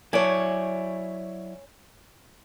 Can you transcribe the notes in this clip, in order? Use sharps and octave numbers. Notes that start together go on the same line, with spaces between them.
F#3 E4 C#5 D5 G#5